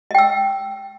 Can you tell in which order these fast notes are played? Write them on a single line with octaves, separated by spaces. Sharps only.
D#5 G5 E6